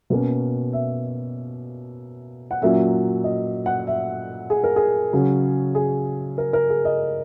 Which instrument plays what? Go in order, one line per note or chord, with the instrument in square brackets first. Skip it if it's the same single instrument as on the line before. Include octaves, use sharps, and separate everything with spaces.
[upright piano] B2 A#3 C#4
E5
F#5
A#2 F#3 A#3 C#4 E5
D#5
F#5
E5
G#4
A#4
G#4
C#3 F#3 C#4
G#4
A#4
A#4
G#4
D#5